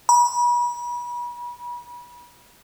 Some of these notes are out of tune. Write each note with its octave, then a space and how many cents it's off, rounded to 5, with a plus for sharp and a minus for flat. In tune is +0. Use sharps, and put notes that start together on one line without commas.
B5 -35